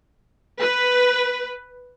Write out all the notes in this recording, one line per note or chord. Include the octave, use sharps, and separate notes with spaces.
B4